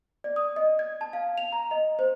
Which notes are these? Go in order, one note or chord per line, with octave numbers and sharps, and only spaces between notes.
D5
D#6
D#5
G#6
A5
F5
F7
A#5
D#5
C5